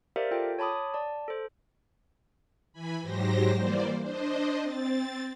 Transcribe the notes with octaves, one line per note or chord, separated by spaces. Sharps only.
G4 A#4 C5 D5 E5 F5
F4 A4 G5
C#5 A5 B5 D6 D#6
D5 A5
A4 C5
E3 G#5 B5
G#2 F#3 G4 C5 A#6
E3 G3 A#3 C5 D5
D4 C5 D#5
C4 A6